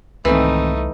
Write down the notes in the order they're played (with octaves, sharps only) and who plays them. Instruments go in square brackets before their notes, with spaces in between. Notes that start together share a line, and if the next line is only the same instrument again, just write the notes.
[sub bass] C2 [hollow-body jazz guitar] G#2 D#3 C4 [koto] E3 [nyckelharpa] A3 D#4